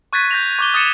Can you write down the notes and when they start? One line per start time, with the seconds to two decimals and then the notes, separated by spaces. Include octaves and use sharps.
0.13 C#6 F#6 G#6 A6 B6 D#7
0.31 G6 A#6 F7
0.59 C#6 D6 G7
0.74 D#6 G#6 A6 C#7 D#7 E7